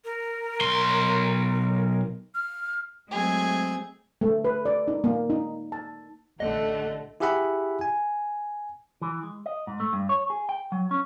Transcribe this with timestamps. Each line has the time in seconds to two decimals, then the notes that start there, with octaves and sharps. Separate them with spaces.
0.05 A#4
0.61 B1 C6
2.35 F6
3.10 F#3 G#3 A3 C4 G#4 G#6
4.21 A3
4.44 B4
4.65 D5
4.88 D#4
5.04 A#3
5.30 D#4
5.72 A5
6.40 A1 D3 A3 D#5 F#5
7.20 E4 G4 G#4 E5 F#5 B5
7.81 G#5
9.01 E3
9.23 G#3
9.46 D#5
9.67 G#2
9.80 A3
9.93 G2
10.09 C#5
10.30 G#4
10.49 G5
10.72 F#3
10.91 C#4